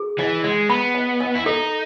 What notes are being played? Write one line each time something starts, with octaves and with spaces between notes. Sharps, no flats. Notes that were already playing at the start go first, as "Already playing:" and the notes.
Already playing: G#4
E3 D#5
G#3 D#5
B3 B5
D#5
D#5
E4
D#4 A4